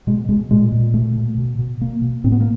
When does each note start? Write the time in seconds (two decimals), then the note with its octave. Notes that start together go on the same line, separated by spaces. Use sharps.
0.07 B2 G#3
0.29 B2 G#3
0.51 A#2 G#3
0.72 A#2
0.94 B2 A3
1.16 B2
1.38 B2
1.59 B2
1.81 B2 A#3
2.02 B2
2.24 A2 C4
2.32 B3
2.41 A#3